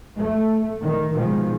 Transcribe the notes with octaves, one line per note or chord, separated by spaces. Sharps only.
A3
D#3
B2 D#3 F3 G#3